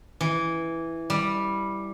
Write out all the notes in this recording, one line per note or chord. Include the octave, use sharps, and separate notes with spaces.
E3
G3